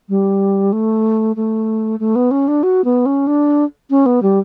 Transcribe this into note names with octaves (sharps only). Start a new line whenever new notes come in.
G3
A3
A3
A3
B3
C#4
D4
F#4
B3
C#4
D4
C#4
B3
G3